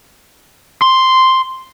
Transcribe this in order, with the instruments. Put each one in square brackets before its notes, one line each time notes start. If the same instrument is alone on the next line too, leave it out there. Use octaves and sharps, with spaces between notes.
[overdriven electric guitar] C6